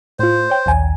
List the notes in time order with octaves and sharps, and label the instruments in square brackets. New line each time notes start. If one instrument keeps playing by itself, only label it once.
[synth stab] A2 F4 [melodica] C5
[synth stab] C#5 G5
[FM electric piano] A#1 D#2 G#5